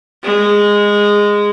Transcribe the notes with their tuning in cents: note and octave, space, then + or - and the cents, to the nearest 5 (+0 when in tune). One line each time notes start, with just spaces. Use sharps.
G#3 -10